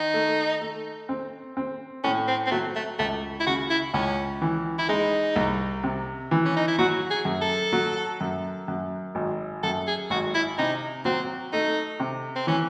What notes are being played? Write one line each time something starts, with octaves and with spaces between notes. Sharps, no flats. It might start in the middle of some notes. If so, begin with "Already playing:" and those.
Already playing: D#3 D#4
A3
A3
C4
C4
A2 C#4
C4
C4
F#3 A3
A3
C#2 A3
E4
C#3 F#4
E4
C#2 C#4
E3
E4
G#3 D#4
C2
C3
E3
C#4
D#4
E4
F#3 F#4
G#4
F#2
A4
F#3
F#2
F#2
G#1
F#2 A4
G#4
G#1 F#4
E4
C3 D#4
F#3 C4
A3 D#4
C3
C4
E3 C#4